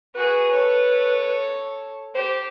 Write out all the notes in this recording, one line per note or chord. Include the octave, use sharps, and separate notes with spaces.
F#4 G#4 B4
A4 C#5
G4 C5